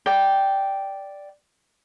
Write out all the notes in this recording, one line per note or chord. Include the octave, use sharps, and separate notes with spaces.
D5 G5